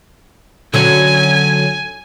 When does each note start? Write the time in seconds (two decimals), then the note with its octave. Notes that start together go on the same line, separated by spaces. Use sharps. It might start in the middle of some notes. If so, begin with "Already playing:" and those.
0.74 D3 F#3 C#4 G#5